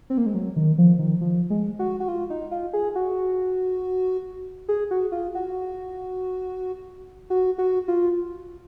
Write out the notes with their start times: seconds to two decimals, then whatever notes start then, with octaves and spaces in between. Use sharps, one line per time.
0.10 C4
0.18 A#3
0.26 G#3
0.34 F#3
0.56 D#3
0.78 F3
0.99 D#3
1.21 F3
1.50 G#3
1.79 F#4
2.00 F#4
2.08 F4
2.30 D#4
2.51 F4
2.73 G#4
2.95 F#4
4.68 G#4
4.91 F#4
5.12 F4
5.35 F#4
7.30 F#4
7.58 F#4
7.88 F4